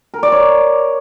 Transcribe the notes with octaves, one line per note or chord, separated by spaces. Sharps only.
A#4
D5
C#5